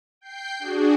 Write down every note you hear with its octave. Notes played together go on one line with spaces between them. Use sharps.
G5 G6 C7
D4 F#4 G#4